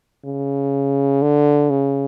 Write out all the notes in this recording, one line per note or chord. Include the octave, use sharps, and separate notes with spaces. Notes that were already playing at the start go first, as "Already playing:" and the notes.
C#3
D3
C#3